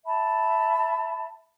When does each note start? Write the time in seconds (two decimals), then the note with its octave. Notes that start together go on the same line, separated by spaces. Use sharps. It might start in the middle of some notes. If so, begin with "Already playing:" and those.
0.05 E5 A5 B5